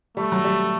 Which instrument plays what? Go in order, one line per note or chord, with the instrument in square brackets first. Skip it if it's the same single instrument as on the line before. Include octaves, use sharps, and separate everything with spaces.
[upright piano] G3 [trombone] A3
[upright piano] F#3
G3